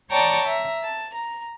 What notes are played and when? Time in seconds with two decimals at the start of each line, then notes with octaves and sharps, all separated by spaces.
0.11 C#5 D5 G5 A5 A#5 C#6
0.46 E5 A#5
0.84 A5
1.14 A#5